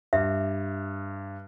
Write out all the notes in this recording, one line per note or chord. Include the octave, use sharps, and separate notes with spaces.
G2 E5